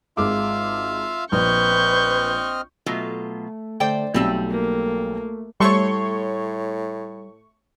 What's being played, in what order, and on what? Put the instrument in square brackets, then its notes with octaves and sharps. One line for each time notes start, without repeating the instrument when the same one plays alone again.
[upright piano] G#1 G#3 D6 [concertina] F4 E5 F5
[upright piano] A#1 [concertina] C4 D#5 F6 [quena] B4 [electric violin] C#6 G6
[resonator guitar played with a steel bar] B2 F#3 F4 [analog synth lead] A3
[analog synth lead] D3 [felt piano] A3 [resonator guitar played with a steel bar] C5 D5 G5
[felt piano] B1 [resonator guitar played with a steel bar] G3 C4 A5 [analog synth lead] A3
[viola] A#3
[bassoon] A2 [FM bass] G3 [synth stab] A3 C#6 [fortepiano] C#5 C6